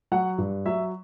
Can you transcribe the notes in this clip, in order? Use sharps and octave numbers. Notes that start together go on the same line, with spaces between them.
F#3 F#5
G2
F#3 E5